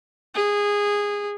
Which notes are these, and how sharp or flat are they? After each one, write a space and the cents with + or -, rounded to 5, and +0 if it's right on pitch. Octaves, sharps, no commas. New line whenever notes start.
G#4 -15